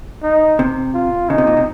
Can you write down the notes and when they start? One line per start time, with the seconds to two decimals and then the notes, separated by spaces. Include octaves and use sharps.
0.23 D#4
0.59 C3
0.94 F4
1.29 C#3 D#4
1.38 C3
1.47 A#2
1.57 C3